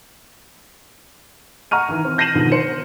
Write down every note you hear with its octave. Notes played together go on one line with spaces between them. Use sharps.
F#5 A#5 C#6 F6 D#7
D#3 E3
C4
G6 A#6 C7 D#7 E7 F#7
B2 D3 D#3 F3 F#3
C5 C#7